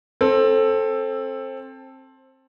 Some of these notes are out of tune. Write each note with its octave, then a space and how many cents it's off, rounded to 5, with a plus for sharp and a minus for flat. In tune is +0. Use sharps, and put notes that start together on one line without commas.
C4 +20 A4 +0